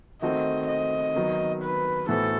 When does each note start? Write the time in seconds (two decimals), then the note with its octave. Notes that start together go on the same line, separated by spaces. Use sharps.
0.22 D#3 A3 C4 F#4 A4 D#5
0.68 D#5
1.15 D#3 F#3 B3
1.62 B4
2.09 A2 E3 B3 F#4 A4 C5